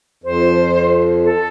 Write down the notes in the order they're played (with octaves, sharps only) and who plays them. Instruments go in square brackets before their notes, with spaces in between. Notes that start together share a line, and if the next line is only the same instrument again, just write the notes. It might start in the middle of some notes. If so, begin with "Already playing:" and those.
[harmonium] F2 [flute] C5
[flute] A4